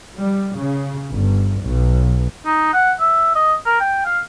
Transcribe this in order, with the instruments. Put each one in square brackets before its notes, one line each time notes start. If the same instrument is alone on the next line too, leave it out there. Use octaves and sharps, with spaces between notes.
[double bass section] G3
C#3
G1
B1
[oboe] D#4
F#5
E5
D#5
A#4
G5
F5